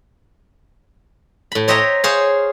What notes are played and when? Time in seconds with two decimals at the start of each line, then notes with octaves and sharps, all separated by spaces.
1.52 A2 B5
1.68 C5 C#5 D#5 E5 G5 A#5
2.04 G#4 C5 C#5 F5 G#5